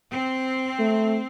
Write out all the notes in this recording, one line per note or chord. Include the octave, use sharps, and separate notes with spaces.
C4
A3